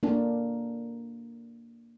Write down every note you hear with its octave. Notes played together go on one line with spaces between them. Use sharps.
A#3 D4